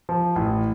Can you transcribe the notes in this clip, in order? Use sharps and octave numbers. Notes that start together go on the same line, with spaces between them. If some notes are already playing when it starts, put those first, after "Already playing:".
F3
A1